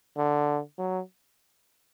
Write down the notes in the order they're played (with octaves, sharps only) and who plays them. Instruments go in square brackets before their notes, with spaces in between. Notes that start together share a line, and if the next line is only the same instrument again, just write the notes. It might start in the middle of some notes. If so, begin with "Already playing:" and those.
[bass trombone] D3
F#3